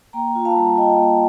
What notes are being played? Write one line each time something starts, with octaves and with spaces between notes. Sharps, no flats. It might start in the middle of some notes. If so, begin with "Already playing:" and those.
A#3 G5 A#5
F4
F5 A5
G3
F4 D#5 G5
A#3